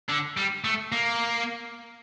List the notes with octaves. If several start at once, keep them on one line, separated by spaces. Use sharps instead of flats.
D3
G3
A3
A#3